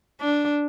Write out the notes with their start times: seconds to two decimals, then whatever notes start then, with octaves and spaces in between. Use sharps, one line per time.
0.21 D4